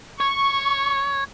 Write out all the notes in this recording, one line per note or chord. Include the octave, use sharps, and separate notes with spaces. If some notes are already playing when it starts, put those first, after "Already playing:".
C#5 C#6